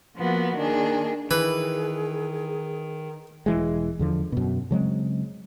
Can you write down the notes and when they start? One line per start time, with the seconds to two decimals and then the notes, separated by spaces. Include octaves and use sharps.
0.16 F3 A#3 B3 F#4
0.56 D#3 A#3 D4 G#4
1.31 D#3 E3 G#4 B4
3.46 E1 E3 G#3
3.99 E2 D3 F3
4.32 F#2 B2
4.71 C#3 F#3 G#3 C4